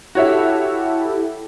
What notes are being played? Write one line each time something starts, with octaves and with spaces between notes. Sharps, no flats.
E4 F#4 G4 A4 C#5 E5